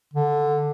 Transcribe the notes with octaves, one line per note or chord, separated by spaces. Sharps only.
D3